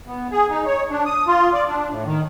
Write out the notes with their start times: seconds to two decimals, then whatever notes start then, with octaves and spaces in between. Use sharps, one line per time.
0.08 B3
0.31 G#4
0.50 D#4
0.66 C#5
0.91 D4
1.06 D#6
1.27 F4
1.53 D5
1.68 D4
1.90 A2
2.06 D#3